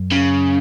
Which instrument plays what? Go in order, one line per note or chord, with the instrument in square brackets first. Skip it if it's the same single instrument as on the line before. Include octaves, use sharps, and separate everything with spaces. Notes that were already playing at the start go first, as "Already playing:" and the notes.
Already playing: [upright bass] F#2
[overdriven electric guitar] C#3